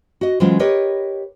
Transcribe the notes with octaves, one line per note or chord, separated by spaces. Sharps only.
F#4 D#5
E3 F#3 G#3 C#4 F4 C5
G4 A#4 B4 C#5 D#5